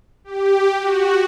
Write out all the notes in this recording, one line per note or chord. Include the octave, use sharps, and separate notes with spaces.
G4
F#4